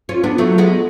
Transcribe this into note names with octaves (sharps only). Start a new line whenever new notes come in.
C#4 F4
B3 D4
F#3 A3
G#3 B3